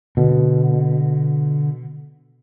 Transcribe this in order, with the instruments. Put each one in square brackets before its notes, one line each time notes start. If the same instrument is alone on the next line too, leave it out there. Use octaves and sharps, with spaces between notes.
[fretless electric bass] B2 [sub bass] D3